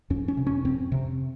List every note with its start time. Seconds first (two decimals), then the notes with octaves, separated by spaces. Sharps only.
0.10 F2 C#4
0.28 C#4
0.37 C3
0.47 C#4
0.64 F2 C4
0.92 C3